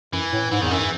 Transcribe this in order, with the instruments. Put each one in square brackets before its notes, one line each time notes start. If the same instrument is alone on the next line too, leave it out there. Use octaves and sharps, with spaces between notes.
[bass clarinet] F#2 [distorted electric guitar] E3
[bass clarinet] A2
[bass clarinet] G#2 [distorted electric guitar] E3
[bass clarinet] E2 [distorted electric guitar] D#3
[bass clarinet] F#2 [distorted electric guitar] E3